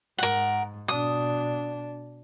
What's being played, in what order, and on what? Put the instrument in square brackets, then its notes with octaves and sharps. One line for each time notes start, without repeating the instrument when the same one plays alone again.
[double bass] G#2 [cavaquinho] A#4 F#5
[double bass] B2 D4 [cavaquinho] D#6